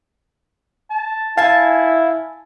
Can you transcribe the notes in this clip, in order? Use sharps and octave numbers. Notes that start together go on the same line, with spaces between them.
A5
E4 F5 G#5 A5